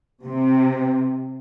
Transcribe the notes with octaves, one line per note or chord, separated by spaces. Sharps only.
C3